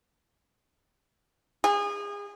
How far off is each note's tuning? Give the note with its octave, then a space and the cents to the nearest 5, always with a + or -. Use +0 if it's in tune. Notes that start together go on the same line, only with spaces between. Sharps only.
G#4 -30